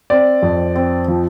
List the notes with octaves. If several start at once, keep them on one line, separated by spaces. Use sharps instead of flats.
C4 D5
F2
C4
F3